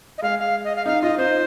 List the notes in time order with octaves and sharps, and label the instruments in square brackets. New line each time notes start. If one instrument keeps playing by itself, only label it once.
[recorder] D#5
[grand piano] G#3 [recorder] F5
[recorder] F5
D#5
F5
[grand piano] D#4 [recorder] F5
[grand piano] F4 [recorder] D#5
[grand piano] D#4 [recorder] C5